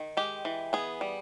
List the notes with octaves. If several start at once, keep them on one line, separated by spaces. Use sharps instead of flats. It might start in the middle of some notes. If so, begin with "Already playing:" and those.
Already playing: D#3
G#3 G4
E3
B3 G#4
G3